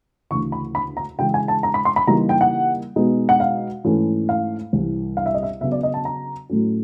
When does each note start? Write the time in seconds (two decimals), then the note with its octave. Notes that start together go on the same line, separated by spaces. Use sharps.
0.30 D2 C#3 E3 C#6
0.52 B5
0.75 B5
0.97 A#5
1.19 C#3 E3 G#3 G5
1.34 G#5
1.48 A5
1.63 A#5
1.74 B5
1.85 C6
1.96 B5
2.07 C#3 E3 G3 A#3 D#4 A#5
2.29 G5
2.41 F#5
2.96 B2 G#3 B3 D#4
3.29 F#5
3.40 F5
3.84 G#2 E3 A3 C#4
4.29 F5
4.73 C2 C3 E3
5.17 F5
5.26 E5
5.34 D#5
5.43 E5
5.61 C#3 F#3 B3 E5
5.72 D5
5.83 D#5
5.94 A5
6.05 A#5
6.49 A2 F#3 A3 C#4